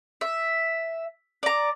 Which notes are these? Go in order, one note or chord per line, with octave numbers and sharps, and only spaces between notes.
E5
D5 A#5